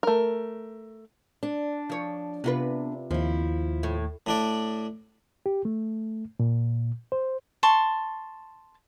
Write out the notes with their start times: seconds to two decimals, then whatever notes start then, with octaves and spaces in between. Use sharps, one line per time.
0.03 A3 A#4
1.43 D4
1.90 F3 C#5
2.44 C3 B3 F4 B4
3.11 D#2 F3 E4
3.83 A2
4.26 A2 D4 D5
5.46 G4
5.65 A3
6.40 A#2
7.12 C5
7.63 A5 C6 C#6